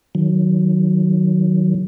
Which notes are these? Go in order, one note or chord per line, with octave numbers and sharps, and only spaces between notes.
D#3 F#3